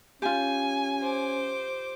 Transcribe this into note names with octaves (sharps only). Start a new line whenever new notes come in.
C#4 F4 G4 G#5
C5 D6